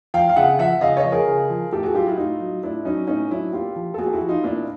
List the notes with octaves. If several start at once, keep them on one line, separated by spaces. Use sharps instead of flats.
F3 F5 G5
F5
C#3 E5 F#5
F3 E5 F#5
C#3 D#5 F5
C#5 D#5
F3
G#4 A#4
C#3
F3
A2 G4 A4
F#4 G#4
F#3 F4 G4
E4 F#4
A2 D#4 F4
F#3
A2 D4 E4
F#3 C#4 D#4
A2 C#4 D#4
F#3 D4 E4
A#2 F4 G4
F3
A4
A#2 F#4 G#4
G4
E4 F#4
F3
D#4 F4
A#2 D4 E4